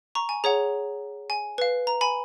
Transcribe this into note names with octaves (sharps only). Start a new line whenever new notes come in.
A#5 C#6
G#5
G#4 C#5 F#5 A#5
G#5
B4 F5
A#5
G#5 B5